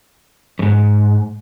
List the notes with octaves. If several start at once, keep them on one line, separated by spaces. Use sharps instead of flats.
F2 G#2